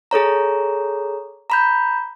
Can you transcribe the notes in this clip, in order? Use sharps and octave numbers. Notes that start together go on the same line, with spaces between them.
G#4 A4 C#5 A#5
A#5 B5 G6